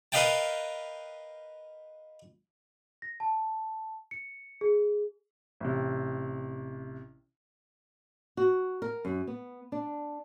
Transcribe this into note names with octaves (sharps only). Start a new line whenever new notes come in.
A#4 B4 D#5 F5 G5 A5
A#6
A5
C#7
G#4
A1 C3
F#4
A#4
F#2
B3
D4